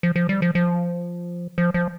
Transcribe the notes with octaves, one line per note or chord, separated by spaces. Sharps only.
F3
F3
G3
F3
F3
F3
F3